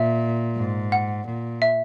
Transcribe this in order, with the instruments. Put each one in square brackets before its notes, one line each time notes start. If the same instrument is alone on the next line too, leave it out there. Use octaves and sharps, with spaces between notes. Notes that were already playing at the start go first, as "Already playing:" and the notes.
Already playing: [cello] A#2 [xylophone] E5
[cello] G#2
[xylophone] F#5
[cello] A#2
[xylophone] E5